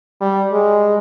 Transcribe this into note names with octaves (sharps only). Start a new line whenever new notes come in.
G3
G#3